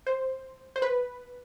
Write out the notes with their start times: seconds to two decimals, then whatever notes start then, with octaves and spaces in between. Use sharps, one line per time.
0.07 C5
0.76 C5
0.82 B4